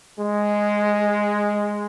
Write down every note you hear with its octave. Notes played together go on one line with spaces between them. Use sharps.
G#3